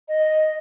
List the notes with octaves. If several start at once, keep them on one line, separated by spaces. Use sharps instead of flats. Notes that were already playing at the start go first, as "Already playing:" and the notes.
D#5